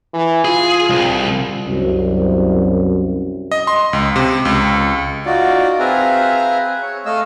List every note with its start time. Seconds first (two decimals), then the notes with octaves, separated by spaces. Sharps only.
0.14 E3
0.45 F4 G#4
0.90 C2
1.67 C2 F#2
3.51 D#5
3.67 C6
3.93 C#2
4.16 C3
4.45 C#2
5.26 D#4 F4 F#4 D5
5.79 C4 G#4 B4 E5 F5 A#5
6.82 C#5
7.06 A3 D#5 F5 E6